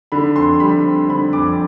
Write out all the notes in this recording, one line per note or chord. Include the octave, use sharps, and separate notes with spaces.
D3 B5
F2 C6
G3 B5
C4
D3 B5
F2 D6